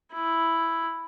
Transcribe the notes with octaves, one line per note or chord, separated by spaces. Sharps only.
E4